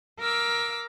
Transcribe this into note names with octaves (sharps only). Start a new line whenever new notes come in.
A#4 F5 D6 E6